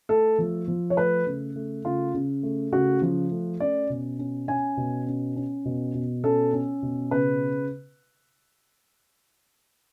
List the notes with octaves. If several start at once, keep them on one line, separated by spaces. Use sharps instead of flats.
A3 A4
F3
F3
C#5
A3 B4
C#3
A3
C#3 F4
C#3
A3
C#3 F#4
F3
A3
C#4 D5
B2
C#4
C#4 G#5
B2
C#4
C#4
B2
B2
C#4 A4
C#4
B2
C#3 B4